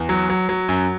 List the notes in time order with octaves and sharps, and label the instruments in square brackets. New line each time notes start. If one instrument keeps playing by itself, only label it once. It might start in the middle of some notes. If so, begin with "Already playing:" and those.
Already playing: [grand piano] E2
F#3
F#3
F#3
F#2